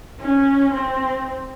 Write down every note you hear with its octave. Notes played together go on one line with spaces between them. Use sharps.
C#4
C4